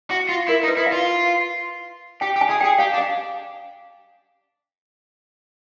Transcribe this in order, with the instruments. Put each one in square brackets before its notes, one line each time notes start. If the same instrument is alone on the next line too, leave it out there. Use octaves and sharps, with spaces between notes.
[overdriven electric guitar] F#4
F4
[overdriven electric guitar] E4 [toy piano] A#4
[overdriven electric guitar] D#4
[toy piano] B4
[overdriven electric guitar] E4
[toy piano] F5
[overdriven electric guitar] F4
[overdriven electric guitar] G4 [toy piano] G5
[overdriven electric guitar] G4
[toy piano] G#5
[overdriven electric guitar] G#4
[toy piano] G5
[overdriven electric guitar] G#4
[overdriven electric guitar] G4 [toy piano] F5
[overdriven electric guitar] D4
[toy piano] F5